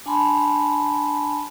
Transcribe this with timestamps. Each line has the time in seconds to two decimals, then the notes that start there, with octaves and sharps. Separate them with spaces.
0.06 D4 G#5 A5 B5 C6